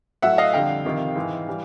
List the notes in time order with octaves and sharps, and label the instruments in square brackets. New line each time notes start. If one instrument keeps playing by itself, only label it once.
[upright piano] A2 F#3 A3 E5 F#5
D#5 F5
F2 D3 G3 F5 G5
F2 C3 D#3
G#2 E3 G#3
E3 G3